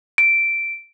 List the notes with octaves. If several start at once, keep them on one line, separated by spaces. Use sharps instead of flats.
D7